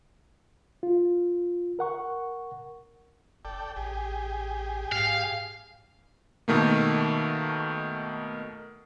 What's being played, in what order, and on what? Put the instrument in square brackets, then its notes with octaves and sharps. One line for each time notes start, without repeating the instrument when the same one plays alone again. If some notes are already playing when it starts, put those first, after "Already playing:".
[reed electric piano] F4
A#4 F#5 C#6
[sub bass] F#1 [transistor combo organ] A4 D5 G5
[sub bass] A1 [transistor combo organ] G4 G#4
[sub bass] G#2 [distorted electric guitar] F5
[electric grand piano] B2 D#3 A3 A#3